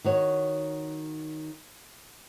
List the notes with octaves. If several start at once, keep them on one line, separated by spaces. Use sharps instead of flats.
D#3 F#4 C#5